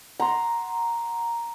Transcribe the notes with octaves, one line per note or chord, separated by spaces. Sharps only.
F#5 A#5 C6